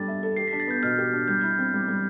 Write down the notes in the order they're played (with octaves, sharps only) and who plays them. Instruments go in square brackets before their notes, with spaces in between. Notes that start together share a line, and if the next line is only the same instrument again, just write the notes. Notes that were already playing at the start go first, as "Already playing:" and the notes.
Already playing: [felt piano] G3 D4 A4 [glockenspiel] A6
[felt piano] E5
A4
[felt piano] G4 [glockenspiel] C7
[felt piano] D4 [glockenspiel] B6
[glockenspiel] A6
[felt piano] B3 [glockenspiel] G6
[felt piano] B2 [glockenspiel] F6
[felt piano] G4
D4
[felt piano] G3 [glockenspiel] G6
[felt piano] E4
C4
G3
G3